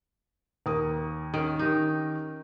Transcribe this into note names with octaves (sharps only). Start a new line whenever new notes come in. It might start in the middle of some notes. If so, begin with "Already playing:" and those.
D#2 A#4 D#6
D#3 C#4
D#3 D#4 G4